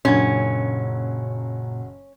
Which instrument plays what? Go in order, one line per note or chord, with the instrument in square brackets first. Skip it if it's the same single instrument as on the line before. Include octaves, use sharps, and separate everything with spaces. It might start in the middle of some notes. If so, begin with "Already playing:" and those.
[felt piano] F#1 F#3 G#6 [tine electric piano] A#2 [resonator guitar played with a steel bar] C#4 [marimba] D4